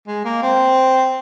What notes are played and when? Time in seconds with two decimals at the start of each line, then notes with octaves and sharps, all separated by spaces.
0.08 G#3
0.25 A#3
0.42 C4